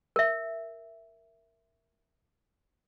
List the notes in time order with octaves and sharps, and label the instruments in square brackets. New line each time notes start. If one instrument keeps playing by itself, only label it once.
[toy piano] A#4 E5